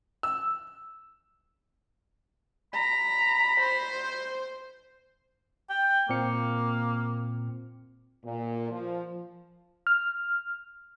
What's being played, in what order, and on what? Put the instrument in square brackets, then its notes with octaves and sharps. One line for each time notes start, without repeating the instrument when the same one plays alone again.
[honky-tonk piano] E6
[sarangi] A#5 [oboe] B5
[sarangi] C5
[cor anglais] G5
[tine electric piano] A#2 C4 C#7 [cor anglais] A#3
[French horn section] A#2
F3
[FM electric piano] F6